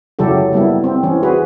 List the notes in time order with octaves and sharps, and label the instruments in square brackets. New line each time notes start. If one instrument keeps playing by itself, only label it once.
[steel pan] C#3 F#3 E4 G4 A4
G3 A#3 B3 E4
C4
E3 C#4
F#4 G#4 B4